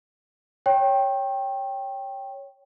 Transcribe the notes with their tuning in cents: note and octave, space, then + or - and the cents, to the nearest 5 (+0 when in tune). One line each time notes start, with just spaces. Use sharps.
C#5 +0 G5 +0 C#6 -40